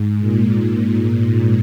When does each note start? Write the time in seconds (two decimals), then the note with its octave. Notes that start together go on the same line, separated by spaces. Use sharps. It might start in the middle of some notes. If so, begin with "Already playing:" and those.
Already playing: G#2
0.19 A#2